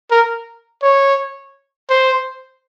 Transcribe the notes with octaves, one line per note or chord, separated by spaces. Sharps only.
A#4
C#5
C5